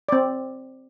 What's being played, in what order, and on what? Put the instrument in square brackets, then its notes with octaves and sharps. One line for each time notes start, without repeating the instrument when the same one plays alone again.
[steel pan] C4 D5